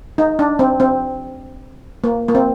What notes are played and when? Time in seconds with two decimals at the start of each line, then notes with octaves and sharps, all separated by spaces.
0.18 D#4
0.39 D4
0.59 C4
0.80 C4
2.04 A#3
2.28 A#3
2.35 C4